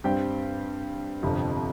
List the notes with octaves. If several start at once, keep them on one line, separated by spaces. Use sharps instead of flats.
G2 G3 C4 G4 G5
G1 F2 C3 F3